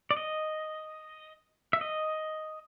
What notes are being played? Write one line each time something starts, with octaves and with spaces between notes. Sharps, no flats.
D5
D#5
E5
D#5